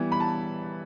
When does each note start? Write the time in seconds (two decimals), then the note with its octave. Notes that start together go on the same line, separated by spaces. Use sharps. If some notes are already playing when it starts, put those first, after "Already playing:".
Already playing: E3 G3 B3
0.12 B5
0.20 A5